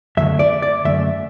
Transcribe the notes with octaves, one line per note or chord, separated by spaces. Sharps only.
F#2 D3 A3 E5
D5
D5
F#2 D3 A3 E5